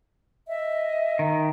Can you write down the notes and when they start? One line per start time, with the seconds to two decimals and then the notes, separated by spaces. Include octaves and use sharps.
0.48 D#5 E5
1.19 D#3